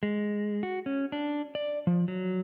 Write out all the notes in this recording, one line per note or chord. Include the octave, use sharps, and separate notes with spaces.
G#3
F#4
C#4
D4
D5
F3
F#3